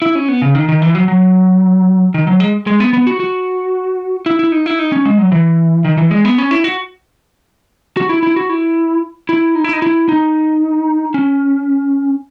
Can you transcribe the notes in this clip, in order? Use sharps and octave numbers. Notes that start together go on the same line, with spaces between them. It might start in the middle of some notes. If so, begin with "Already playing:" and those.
E4
C#4
B3
C#3
D#3
D#3
E3
F#3
F#3
D#3
F#3
G#3
G#3
B3
B3
F#4
F#4
E4
E4
D#4
E4
D#4
C#4
G#3
F#3
E3
D#3
E3
G#3
B3
C#4
E4
F#4
F#4
E4
E4
F#4
E4
E4
D#4
E4
D#4
E4
D#4
C#4